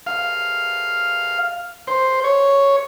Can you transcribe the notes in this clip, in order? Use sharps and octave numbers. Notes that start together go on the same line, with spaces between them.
F5
C5
C#5